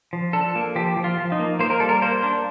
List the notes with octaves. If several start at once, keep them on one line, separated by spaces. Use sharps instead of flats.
F3
D4 A4
A#3
F3 G4
F3
F4
F3
D#4
A#3
A#3 C5
A#4
G3 A4
A#4
A#3 C5
D4